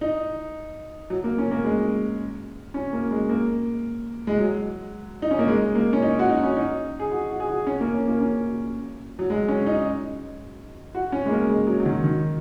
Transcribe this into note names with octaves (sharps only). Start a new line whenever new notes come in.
D#4
F#3
A#3
C#4
A#3
G#3
C#4
A#3
G#3
A#3
G#3
F#3
D#4
C#4
A#3
G#3
A#3
C#4
D#4
F#4
D#4
C#4
D#4
G#4
F#4
F#4
G#4
F#4
C#4
A#3
C#4
A#3
C#4
F#3
G#3
C#4
D#4
F#4
C#4
G#3
A#3
G#3
F#3
F#3
D#3
D#3